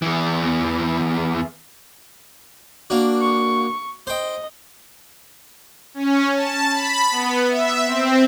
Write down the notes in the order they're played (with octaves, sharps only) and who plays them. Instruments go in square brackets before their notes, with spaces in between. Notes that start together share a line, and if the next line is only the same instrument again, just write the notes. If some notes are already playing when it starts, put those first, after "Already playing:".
[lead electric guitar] E2 E3
[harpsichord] A#3 D4 F#4
[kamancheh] C#6
[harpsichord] C5 G5 [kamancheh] D#5
[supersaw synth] C#4
A5
B5
B3
E5
C4